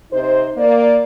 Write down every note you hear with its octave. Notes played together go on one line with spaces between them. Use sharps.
C3 D#4 C5
A#3 D5